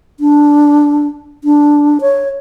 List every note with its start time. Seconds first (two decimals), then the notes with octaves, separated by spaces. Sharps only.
0.20 D4
1.44 D4
2.01 C#5